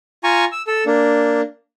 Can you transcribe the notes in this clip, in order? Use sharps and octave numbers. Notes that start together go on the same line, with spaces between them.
F4 G#5 A#5 C#6
E6
A4 E6
A#3 D4